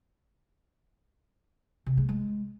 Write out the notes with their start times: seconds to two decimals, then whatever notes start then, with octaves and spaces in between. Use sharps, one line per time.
1.86 C3
1.98 G#3
2.09 G#3